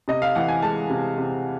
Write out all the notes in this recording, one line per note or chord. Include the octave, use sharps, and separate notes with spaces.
C3 D#5
F5
E3 F#5
G#5
G#3 A5
C3
C3